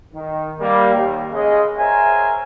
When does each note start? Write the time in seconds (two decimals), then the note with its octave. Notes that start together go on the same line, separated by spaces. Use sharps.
0.14 D#3
0.59 G3 A#3
0.94 D#2
1.31 C#3 G#3 D#5
1.78 G#4 A#4 C5 C#5 E5 G#5